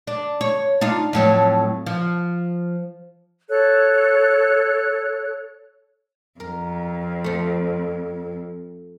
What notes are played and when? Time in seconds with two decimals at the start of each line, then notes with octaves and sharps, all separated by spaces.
0.07 D4
0.41 C#5
0.81 D4 D#4 F4
1.13 F2 A2 F#3
1.86 F3
3.49 A4 C#5 F#6
6.40 F2 A#4
7.24 F3 A3